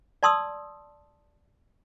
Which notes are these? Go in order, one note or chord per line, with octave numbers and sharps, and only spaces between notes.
D5 A5 C6 D#6 E6